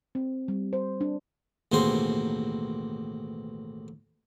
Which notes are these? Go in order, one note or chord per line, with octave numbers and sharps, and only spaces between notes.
C4
G3
C5
D4
A1 D#2 B2 C4 G#4 C6